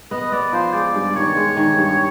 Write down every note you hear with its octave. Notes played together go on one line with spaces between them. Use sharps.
B3 D#5
B3 D5
F3 C5
G#3 D5
G2
D#3 C#5
G#3
D#3
G2